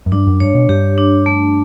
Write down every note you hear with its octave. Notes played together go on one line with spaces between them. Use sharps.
F#2
G2 D4
F#2
G2 C#5
B2
G2 G4
D4
A3